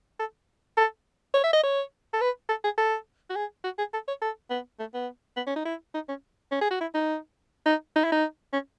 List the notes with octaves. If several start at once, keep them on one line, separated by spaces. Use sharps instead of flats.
A4
A4
C#5
E5
D#5
C#5
A4
B4
A4
G#4
A4
F#4
G#4
F#4
G#4
A4
C#5
A4
B3
A3
B3
B3
C#4
D#4
E4
D#4
C#4
C#4
G#4
F#4
E4
D#4
D#4
D#4
E4
D#4
C#4